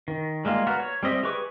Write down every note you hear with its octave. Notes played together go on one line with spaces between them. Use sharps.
D#3
G3 G#3 A#3 F4
B3 F#4 A#4
C#5
G3 C4 D#5 E5
G4 G#4 B4 C#6 D6